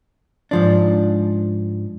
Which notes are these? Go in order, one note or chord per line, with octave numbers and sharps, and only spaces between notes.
G#2 F3 D4